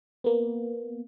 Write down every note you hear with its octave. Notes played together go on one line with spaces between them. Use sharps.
A#3 B3